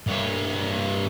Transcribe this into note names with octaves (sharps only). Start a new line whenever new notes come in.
G2 C#5